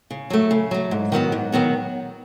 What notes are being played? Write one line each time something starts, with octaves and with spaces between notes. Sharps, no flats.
C#3
F#3 A3
C#3
F#3 A3
G#2
D#3 F#3 B3 F#4
G#2
D#3 F#3 B3 F#4